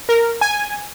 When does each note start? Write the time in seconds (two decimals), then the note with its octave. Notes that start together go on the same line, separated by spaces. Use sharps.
0.09 A#4
0.41 G#5